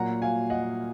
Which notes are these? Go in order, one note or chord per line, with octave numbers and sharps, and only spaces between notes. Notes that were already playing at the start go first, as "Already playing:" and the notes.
Already playing: A#2 F#3 A#3 F#5 A#5
F5 G#5
D#5 F#5